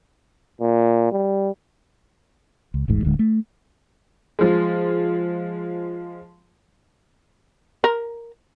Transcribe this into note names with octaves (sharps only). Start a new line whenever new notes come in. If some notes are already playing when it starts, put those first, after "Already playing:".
A#2
G3
C#2
D#1 A1 G#2
D1 D3 G#3
A3
F3 G#3
A#4